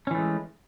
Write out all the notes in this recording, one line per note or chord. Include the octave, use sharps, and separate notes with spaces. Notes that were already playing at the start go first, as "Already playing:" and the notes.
E3 G#3 A3 C#4